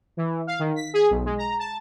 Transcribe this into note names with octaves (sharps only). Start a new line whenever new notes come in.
E3
F5
D#3
B6
G#4
B1
G#3
A#5
A5